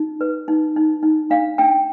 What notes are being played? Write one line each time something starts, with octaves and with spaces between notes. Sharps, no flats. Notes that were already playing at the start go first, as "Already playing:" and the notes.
Already playing: D#4
B4
D#4
D#4
D#4
D4 F5
D4 G5